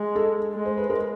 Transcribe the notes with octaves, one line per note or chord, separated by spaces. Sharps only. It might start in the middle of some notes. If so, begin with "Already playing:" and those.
Already playing: G#3
A4
G#3
C5
B4
A#4